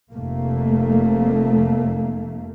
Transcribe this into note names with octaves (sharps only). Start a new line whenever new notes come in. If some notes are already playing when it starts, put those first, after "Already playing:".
F1 A3 A#3